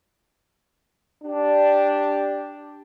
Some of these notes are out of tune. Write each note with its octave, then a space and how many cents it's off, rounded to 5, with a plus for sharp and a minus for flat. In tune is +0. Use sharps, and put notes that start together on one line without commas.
D4 +0 G4 +0